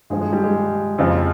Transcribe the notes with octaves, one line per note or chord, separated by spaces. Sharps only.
G2 F3 G#3
G#3
G3
G#3
F2 C#3 F3